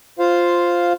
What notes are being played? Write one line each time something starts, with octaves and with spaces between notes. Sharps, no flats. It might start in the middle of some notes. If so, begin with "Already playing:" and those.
F4 C5 F5